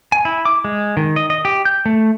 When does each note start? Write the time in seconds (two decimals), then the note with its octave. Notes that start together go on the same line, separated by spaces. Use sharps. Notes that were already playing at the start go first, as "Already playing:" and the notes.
0.12 G#5
0.25 E4
0.45 D6
0.65 G#3
0.97 D#3
1.16 D#5
1.30 D#5
1.45 G4
1.65 G6
1.86 A3